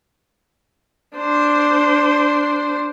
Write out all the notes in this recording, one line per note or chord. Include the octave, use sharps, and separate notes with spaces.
D4 C5